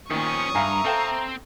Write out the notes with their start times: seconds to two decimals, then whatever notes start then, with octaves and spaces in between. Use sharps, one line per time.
0.10 A#2 D#3 F3 C#4 C#6 D#6
0.55 G2 E5 F5 G#5 A#5
0.85 C4 A4 F5 G5